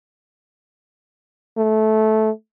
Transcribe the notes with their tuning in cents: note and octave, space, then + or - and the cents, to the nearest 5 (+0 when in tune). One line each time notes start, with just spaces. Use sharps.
A3 -15